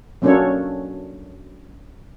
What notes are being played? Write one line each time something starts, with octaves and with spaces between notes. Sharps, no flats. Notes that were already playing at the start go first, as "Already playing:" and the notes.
F#3 A#3 C#4 D4 A4 C#5